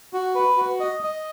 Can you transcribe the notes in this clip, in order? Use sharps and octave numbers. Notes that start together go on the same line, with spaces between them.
F#4
B4
F#4
D#5
D#5